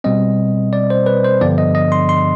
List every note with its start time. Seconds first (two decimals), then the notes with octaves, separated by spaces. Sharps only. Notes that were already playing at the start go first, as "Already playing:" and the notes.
0.04 B2 G3 C4 D#5
0.73 D5
0.90 C5
1.06 B4
1.24 C5
1.41 G2 D3 F3 B3 D5
1.58 D#5
1.75 D#5
1.92 C6
2.09 C6